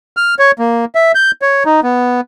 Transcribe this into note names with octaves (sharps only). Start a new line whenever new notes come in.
F6
C#5
A#3
E5
G6
C#5
D#4
B3